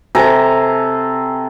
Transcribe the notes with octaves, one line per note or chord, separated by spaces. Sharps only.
C3 A4 G#5 A#5